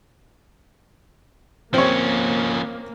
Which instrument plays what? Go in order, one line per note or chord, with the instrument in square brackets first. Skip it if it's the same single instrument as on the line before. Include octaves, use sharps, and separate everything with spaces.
[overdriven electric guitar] F3 C#4 [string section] A#3 [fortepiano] C4 C#5